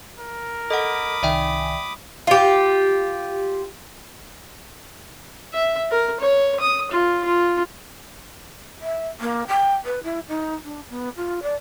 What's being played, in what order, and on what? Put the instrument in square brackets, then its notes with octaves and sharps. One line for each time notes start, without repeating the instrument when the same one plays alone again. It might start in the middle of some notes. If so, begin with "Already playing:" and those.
[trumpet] A#4
[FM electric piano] A4 [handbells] D#5 F#5 [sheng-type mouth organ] B5 D6 D#6
[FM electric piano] C2 D#3 G#5 [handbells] D5 E5 G5
[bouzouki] F4 G4
[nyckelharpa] E5
A#4
C#5
D#6
F4
F4
[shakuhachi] E5
A#3
G5
B4
E4
D#4
D4
B3
F4
D5